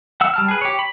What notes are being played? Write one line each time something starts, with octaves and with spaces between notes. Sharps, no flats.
F#5 E6
G3 A5 F6
G#4 B4
G4 C#5
B5